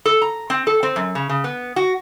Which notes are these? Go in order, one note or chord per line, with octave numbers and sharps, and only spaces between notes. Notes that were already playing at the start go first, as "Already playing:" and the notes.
A4
A#5
C4
A4
C4
F#2
C#3
C#3
B3
F#4